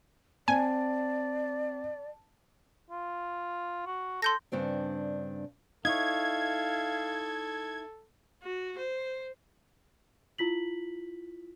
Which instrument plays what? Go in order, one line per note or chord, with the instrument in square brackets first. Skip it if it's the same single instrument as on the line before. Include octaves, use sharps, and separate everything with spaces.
[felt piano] C4 [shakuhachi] D5 [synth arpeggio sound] G#5 [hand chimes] A5
[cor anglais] F4
F#4
[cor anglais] A4 [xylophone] C6 G6 A#6
[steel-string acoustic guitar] G2 C#3 C4 D4
[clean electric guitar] D#4 E4 C#5 [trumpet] A4 [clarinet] F5 [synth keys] G#6
[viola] F#4
C5
[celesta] E4 F4 B6 F#7